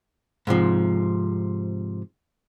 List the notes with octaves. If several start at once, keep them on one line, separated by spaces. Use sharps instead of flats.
G#2 C3 F3